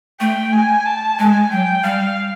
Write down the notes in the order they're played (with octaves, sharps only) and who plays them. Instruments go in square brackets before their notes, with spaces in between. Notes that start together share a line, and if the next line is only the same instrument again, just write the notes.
[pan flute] A3 [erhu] G5
[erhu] G#5
A5
[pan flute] G#3 [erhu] G#5
[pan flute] F#3 [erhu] G5
[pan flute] G3 [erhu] F5